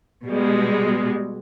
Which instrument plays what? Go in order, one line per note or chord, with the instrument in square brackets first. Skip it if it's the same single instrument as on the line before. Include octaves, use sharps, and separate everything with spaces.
[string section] B2 G3 G#3